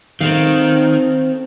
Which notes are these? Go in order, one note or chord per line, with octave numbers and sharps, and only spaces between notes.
D#3 C4 A4 F5